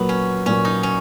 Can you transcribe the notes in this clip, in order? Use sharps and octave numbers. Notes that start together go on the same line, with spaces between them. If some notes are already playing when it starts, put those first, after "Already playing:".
Already playing: A#2 F#3 A#3 B3
C#4
A#2 F#3 A#3 C#4
D#4
C#4